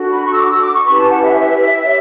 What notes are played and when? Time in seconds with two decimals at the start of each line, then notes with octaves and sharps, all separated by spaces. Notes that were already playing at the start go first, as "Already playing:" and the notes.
Already playing: D4 F#4 A4
0.12 B5
0.23 C#6
0.31 E6
0.36 D6
0.48 E6
0.60 D6
0.72 C#6
0.84 C#4 E4 G4 B4 B5
0.97 A5
1.09 F#5
1.21 E5
1.82 G4 C#5